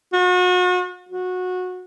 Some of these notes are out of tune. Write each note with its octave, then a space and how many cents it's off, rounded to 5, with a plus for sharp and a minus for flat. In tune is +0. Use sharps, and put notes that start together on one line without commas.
F#4 -40
F#4 -20